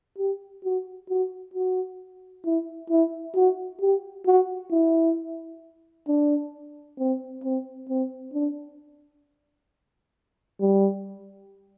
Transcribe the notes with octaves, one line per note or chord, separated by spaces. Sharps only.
G4
F#4
F#4
F#4
E4
E4
F#4
G4
F#4
E4
D4
C4
C4
C4
D4
G3